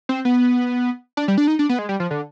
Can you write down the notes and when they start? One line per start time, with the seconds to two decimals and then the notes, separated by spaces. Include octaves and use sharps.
0.09 C4
0.25 B3
1.17 D4
1.28 G3
1.38 D4
1.47 D#4
1.59 D4
1.69 B3
1.79 G#3
1.89 G3
2.00 F3
2.11 D3